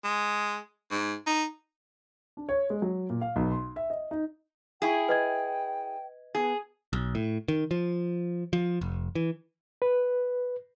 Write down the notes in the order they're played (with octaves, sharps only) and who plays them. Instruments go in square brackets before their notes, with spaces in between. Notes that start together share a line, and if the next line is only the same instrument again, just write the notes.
[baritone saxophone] G#3
G#2
D#4
[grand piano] D4
C#5
G#3
F#3
A#2
F5
B1
C6
E5
D#5
D#4
[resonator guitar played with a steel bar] E4 G#4 [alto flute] G5
[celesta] B4 D#5 G#6
[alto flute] B3 [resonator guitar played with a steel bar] G#4
[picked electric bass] B1
A2
D#3
F3
F3
F1
E3
[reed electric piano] B4